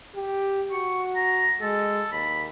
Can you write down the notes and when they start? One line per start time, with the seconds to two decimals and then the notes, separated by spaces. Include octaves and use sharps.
0.16 G4
0.72 F#4 C#6
1.16 A#5
1.61 G#3 A4
2.12 D#2 B5